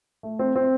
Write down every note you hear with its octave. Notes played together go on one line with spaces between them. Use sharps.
A3
C4
C4